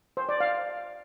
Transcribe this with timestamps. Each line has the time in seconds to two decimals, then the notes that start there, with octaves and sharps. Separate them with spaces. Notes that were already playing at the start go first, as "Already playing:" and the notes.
0.17 C5
0.29 D5
0.40 F5